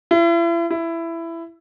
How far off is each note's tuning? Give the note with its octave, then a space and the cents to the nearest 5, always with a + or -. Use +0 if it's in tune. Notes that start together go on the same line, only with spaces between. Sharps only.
E4 +40
E4 +15